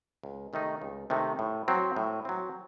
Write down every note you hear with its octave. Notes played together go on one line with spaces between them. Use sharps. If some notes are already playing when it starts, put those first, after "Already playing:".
C#2
C3 D#3 A3 D#4
C#2
C3 D#3 A3 D#4
A2
F#3 C4
A2
F#3 C4